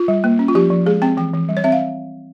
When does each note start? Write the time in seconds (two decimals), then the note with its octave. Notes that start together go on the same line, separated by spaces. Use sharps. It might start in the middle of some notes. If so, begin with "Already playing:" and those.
Already playing: F4
0.08 G3
0.24 A#3
0.39 C#4
0.48 F4
0.55 F3 G4
0.71 F3
0.86 G#3 G#4
1.02 C4 G5
1.17 E3 G5
1.34 E3
1.49 G3
1.57 C#5
1.64 C4 E5
1.72 F5